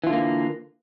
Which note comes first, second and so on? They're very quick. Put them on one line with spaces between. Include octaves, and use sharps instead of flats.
E3 F4 D3 A#3